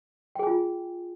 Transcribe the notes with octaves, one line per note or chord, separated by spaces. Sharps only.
F4 G#4 G5 G#5